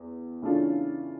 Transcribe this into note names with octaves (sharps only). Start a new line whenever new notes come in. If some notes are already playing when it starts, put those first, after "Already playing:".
Already playing: E2
C#3 E3 A3 D4 F4